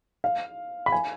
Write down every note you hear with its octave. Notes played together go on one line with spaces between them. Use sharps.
F5
B5
G#5